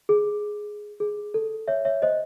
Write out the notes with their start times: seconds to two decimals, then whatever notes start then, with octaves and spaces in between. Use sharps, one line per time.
0.09 G#4
1.00 G#4
1.34 A4
1.68 C#5 E5
1.85 C#5 E5
2.02 C5 D#5